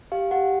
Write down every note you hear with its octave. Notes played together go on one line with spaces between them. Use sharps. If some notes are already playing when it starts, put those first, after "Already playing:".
G4 F5
G4 F#5